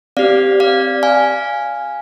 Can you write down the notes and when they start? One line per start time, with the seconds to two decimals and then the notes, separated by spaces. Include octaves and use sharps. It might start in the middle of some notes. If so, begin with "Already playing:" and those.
0.17 C4 G4 D5 F5
0.60 D5 F5
1.03 F5 G#5